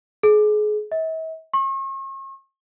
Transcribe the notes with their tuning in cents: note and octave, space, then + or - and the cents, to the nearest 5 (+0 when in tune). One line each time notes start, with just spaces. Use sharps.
G#4 +30
E5 -45
C#6 -40